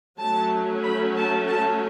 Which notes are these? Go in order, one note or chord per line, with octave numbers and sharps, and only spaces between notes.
F#3 A3 C#4 A5
B5
A5
A5